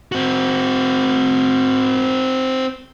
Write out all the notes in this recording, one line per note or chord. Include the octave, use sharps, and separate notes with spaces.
C4 F#4